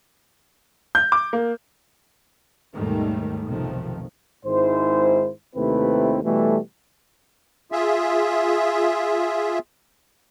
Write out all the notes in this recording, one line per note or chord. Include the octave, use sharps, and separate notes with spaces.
G6
D6
A#3
D#2 G#2 B2 D#3 G3 A3
B1 F2 C3 D#3 F3 A3
G#1 G#2 D#3 E4 C5
D#2 C3 A3 C4 E4 B4
B2 E3 G3 A3
F4 G#4 E5